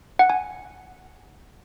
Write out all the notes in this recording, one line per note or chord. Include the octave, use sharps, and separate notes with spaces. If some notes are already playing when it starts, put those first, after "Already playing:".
F#5
G#5